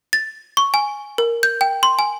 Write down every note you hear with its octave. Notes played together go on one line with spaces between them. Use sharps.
A6
C#6
G#5
A#4
G6
G5
C6
G#5